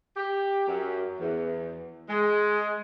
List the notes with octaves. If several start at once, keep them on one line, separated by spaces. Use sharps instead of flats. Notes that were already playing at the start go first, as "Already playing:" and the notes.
G4
F#2
E2
G#3